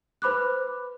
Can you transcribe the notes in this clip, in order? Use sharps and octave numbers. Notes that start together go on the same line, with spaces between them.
B4 C5 B5 D6 F#6